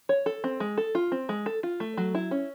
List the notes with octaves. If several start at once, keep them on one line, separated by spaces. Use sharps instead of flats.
C#5
A4
C4
G#3
A4
F4
C4
G#3
A4
F4
A3
F#3
E4
C#4